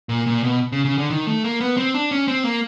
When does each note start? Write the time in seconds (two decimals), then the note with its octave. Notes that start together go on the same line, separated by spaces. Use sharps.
0.09 A#2
0.27 A#2
0.43 B2
0.72 C#3
0.85 C#3
0.98 D3
1.10 D#3
1.27 A3
1.44 A#3
1.61 B3
1.77 C4
1.95 D4
2.11 C#4
2.28 C4
2.45 A#3